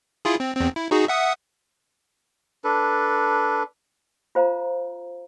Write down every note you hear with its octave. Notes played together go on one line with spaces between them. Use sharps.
E4 F4 G#4
C4
E2 C4
E4
D#4 F#4 G#4
E5 F#5 D#6
D4 A4 B4
F4 C5 F5 A#5